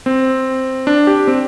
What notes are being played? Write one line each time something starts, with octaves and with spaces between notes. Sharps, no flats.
C4
D4
G4
C4